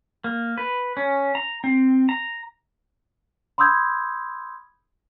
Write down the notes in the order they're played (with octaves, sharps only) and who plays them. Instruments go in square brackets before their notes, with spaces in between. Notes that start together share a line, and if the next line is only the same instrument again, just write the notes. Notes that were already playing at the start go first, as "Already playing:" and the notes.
[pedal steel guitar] A#3
B4
C#4
A#5
C4
A#5
[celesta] B5 C6 D#6 E6 G6 G#6